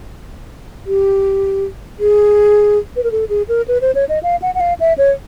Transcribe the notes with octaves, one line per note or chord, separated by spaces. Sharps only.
G4
G#4
B4
A#4
A4
G#4
A#4
B4
C5
C#5
D#5
F5
F#5
F#5
F5
E5
C#5